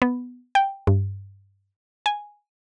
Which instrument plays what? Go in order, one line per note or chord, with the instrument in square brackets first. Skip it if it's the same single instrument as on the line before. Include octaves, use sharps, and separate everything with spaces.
[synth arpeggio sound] B3
G5
G2
G#5